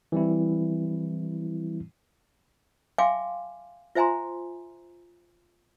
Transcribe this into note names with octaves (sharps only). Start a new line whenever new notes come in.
E3 G3 C4 E4
E5 F5 G5 G#5 C6 D6
F4 C5 E5 G#5 A#5 C6